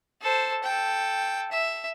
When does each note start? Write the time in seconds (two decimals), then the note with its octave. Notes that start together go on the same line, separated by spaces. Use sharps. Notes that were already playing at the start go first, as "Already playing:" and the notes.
0.22 A4 C5
0.64 A4 G5
1.52 E5